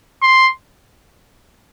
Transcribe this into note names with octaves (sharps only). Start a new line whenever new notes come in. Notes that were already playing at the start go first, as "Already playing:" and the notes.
C6